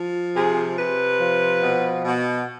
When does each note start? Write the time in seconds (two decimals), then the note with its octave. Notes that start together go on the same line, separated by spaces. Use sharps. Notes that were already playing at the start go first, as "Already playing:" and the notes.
Already playing: F3
0.34 C3 G#4
0.77 C3 B4
1.19 F3
1.62 B2
2.05 B2